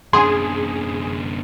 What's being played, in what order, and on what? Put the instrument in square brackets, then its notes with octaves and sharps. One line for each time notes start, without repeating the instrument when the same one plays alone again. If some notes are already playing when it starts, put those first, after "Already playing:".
[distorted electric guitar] F#2 D3 [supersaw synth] G#4 [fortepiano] C6